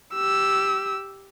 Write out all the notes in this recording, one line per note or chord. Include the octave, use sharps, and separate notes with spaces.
G4 E6